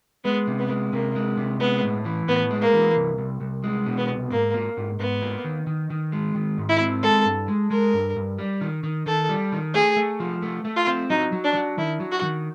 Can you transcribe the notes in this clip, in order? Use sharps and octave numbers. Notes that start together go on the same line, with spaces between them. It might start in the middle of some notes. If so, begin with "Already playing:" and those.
G#3 B3
C3
B3
G#3
C3 A#3
G#3
C3
G#3 B3
A2
E3
A2 B3
G#3
A#3
E3
C2
C2
C2
G#3
B2
B3
C2
G#2 A#3
A#3
G#2
G#2 B3
A#3
D#3
D#3
D#3
G#3
D#3
G#2
E4
C4
G#3 A4
G2
G#3
G#3 A#4
G2
G2
G3
D#3
D#3
D#3 A4
G3
D#3
A3 G#4
A3
F3
A3
A3
F4
C4
F#3 D#4
F#3
D4
F#3
D#3 E4
F#3
F#4
D#3